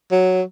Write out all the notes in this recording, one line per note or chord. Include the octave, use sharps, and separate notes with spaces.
F#3